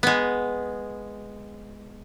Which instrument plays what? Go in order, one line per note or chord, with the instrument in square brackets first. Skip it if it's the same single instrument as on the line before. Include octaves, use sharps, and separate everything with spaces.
[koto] G#3 B3